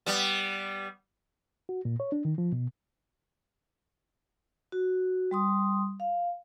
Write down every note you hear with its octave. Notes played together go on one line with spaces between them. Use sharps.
G3 B3
F#4
A#2
C#5
D4
D#3
F3
B2
F#4
G3 C6 D#6
F5